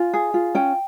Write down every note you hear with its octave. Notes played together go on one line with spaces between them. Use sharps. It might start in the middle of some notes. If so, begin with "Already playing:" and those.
Already playing: F4 G#5
G#4
F4
C#4 G5